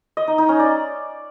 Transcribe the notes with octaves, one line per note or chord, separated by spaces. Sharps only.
D#5
D#4
D#4
C#4
D5